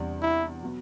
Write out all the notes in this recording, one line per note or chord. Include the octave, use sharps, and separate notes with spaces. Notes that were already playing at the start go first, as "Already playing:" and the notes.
Already playing: E2 C3 G3 D4
E4
B2 F#3 B3 F#4